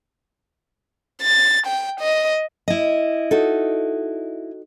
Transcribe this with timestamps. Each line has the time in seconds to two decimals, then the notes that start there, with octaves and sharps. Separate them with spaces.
1.22 A6
1.66 G5
2.00 D#5
2.68 E4 D#5
3.31 D#4 F#4 A4